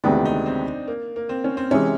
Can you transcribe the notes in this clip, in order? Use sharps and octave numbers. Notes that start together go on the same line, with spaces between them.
D2 C3 D#3 G#3 B3 D4
D#4
C4
A#3
A#3
C4
C#4
C4
C3 E3 G#3 C#4